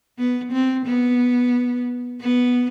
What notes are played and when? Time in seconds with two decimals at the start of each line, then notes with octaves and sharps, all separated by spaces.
0.18 B3
0.52 C4
0.86 B3
2.21 B3